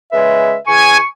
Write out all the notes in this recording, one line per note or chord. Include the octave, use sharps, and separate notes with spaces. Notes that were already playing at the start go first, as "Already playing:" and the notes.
C#3 G#3 B4 E5
E3 G#4 G#5 C#6